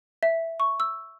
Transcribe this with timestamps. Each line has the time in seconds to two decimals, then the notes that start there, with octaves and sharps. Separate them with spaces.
0.23 E5
0.60 C#6
0.80 E6